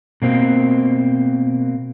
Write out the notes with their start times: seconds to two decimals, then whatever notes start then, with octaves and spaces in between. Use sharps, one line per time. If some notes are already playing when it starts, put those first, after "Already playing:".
0.22 B2 A#3 C4